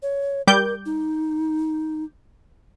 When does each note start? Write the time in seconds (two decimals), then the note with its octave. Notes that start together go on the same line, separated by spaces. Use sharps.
0.02 C#5
0.47 G3 A#4 D6 G6
0.86 D#4